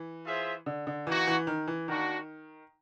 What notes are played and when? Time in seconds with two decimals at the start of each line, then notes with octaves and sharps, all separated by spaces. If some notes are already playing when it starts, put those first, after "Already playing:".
Already playing: E3
0.26 F4 G#4 C5 E5
0.66 D3
0.87 D3
1.07 E3 A#3 D#4 F#4
1.27 E3
1.47 D#3
1.68 E3
1.88 D#3 A#3 D4 F#4